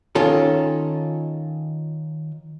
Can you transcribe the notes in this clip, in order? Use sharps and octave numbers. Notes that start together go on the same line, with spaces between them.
D#3 C#4 F4 A4